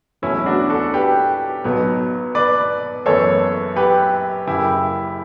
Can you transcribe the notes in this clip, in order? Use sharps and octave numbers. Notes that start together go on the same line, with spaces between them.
E1 E2 B2 F#3 A3 C#4 E4
D4 F#4
F#4 A4
G4 B4
B1 B2 F#3 B3
B4 D5
F#1 F#2 E3 B3 A4 C#5
G4 B4
F#1 F#2 C#3 E4 G4